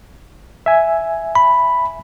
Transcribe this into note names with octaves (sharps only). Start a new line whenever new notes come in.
E5 G#5
B5